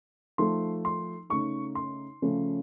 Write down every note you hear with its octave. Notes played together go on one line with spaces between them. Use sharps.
F3 A3 D#4 C6
C6
C#3 A3 D#4 C#6
C6
C#3 F3 A3 C#4